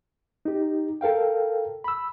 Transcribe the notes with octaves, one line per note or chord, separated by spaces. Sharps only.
D#4 G4
A4 A#4 F5 G5
B5 E6